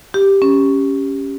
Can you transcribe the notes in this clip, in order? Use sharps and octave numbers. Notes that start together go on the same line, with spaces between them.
G4
C#4